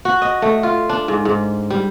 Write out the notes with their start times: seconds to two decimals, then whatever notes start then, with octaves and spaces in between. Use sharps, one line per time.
0.05 F#4
0.22 D#5
0.42 A3
0.63 F4
0.89 D4
1.08 G#2
1.25 G#2
1.70 G3